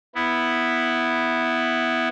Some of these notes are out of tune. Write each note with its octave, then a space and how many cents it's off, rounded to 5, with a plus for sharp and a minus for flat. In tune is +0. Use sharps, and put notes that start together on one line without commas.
B3 +0 E4 +0